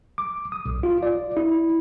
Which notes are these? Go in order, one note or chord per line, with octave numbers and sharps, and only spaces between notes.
D6
D#6
B1
F4
D5
E4